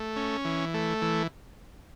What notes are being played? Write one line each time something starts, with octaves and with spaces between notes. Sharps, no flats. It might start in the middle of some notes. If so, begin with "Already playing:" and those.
Already playing: A3
C#4
E3
A3
E3